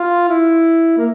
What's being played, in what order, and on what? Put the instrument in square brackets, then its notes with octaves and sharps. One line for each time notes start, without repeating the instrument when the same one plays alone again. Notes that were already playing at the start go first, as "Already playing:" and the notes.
Already playing: [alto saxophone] F4
E4
A#3